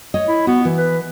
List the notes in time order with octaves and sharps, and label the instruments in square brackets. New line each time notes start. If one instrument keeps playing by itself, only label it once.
[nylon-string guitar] C#5 D#5
[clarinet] E4
[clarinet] B3 [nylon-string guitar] F#4
[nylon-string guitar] E3
[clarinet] B4